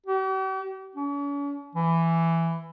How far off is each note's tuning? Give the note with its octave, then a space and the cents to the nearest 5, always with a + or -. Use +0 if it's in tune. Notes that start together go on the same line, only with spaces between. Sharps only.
G4 -45
C#4 +45
E3 +10